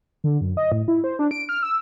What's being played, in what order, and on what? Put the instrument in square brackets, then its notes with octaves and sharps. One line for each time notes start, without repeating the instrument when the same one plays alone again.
[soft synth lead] D3
F#2
D#5
A2
E4
C5
D4
D7
F6
E6